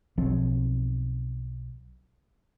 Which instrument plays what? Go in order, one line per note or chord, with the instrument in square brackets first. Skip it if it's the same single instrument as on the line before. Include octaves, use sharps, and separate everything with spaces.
[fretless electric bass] B1 F3 F#3 C4